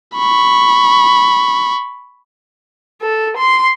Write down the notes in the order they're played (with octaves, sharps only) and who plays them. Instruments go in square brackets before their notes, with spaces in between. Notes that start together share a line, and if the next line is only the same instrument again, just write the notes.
[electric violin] B5 C#6
[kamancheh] A4
C6